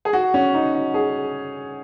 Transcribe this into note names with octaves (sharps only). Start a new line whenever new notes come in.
G#4
F#4
C#4
D#4
F#4
G#4